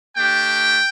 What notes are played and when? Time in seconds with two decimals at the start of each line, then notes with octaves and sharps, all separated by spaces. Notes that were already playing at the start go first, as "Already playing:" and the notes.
0.16 A3 D4 G4 G5